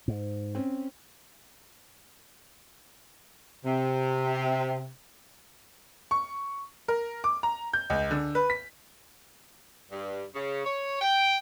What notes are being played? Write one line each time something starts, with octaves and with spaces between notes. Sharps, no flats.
G#2
C4 C#4
C3
C#6
A#4
D6
A#5
G6
C#2
D3
B4
B6
G2
C#3
C#5
G5